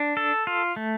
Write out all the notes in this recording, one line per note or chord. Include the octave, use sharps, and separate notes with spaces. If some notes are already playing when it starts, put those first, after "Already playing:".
Already playing: D4
A4
F4
A3